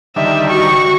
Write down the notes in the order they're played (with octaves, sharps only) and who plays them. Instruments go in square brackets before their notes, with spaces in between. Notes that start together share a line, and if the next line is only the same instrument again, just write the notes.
[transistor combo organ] D3 D#3 G3 [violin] E5
[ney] F#4 [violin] C#6